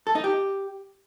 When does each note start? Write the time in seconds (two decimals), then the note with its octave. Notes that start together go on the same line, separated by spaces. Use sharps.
0.07 A4
0.15 D#4
0.24 G4